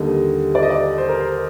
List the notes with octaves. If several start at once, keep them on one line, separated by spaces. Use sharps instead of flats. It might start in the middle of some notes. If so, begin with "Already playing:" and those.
Already playing: D#2 D3 G3 D#5
D5
D#5
D5
C5
A#4
C5